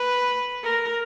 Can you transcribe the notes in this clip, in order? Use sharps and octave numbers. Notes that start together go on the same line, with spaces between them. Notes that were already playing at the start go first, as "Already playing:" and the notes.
Already playing: B4
A#4